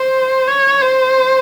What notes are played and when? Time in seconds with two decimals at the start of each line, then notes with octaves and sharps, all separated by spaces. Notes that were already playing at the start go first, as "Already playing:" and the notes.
Already playing: C5
0.47 C#5
0.82 C5